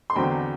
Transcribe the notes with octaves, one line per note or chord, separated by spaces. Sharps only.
C6
E2 D3 F#3 C4 G5 B5